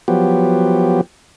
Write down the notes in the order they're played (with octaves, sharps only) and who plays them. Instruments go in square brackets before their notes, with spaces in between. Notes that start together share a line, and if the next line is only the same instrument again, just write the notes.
[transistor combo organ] F3 F#3 B3 G4